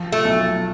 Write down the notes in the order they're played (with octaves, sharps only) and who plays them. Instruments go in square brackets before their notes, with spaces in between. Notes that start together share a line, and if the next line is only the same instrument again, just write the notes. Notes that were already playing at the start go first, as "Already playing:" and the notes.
Already playing: [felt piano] F3
[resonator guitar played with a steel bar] A3
[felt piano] B1